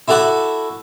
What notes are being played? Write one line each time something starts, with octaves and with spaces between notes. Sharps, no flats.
E4 F#4 A4 F#5 D6